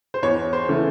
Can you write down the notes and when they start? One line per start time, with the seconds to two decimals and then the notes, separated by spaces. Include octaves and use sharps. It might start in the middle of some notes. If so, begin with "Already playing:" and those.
0.14 C5
0.23 E2 C#5
0.53 C5
0.69 C#3 E3 A3